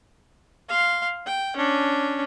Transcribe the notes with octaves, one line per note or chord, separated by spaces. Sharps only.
F5 C6
G5
C#4 D4